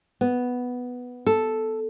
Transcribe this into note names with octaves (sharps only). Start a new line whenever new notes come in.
B3
A4